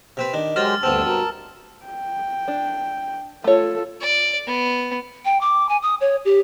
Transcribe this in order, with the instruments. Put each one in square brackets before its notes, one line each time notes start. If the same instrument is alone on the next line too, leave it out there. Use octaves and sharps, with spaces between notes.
[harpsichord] C3 C4 B4
[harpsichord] D#3 D4 [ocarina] D#5
[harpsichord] F#3 A#4 C5 [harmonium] G#3 G4 [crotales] F6 A6
[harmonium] D2 D3 A5 [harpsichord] G2 B3 C4 [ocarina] C5 [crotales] E6
[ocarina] F#4 [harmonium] A#4 A5
[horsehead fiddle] G5
[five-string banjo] D4
[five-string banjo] A3 C#5 [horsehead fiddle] F4 A4
[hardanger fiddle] D5
B3
[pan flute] G5
D6
G#5
D#6
C#5
G4